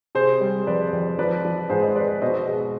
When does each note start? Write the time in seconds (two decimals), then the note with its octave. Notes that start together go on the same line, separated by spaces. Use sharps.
0.15 C3 G#4 C5
0.41 G3
0.67 F2 B4 D5
0.93 F2
1.19 F3 B4 D5
1.45 F3
1.70 G#2 G#4 C5
1.82 C5 D#5
1.95 G#3 B4 D5
2.21 B2 C5 D#5
2.48 G#3